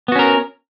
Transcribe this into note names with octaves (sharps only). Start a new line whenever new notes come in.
B3 C#4 F#4 A#4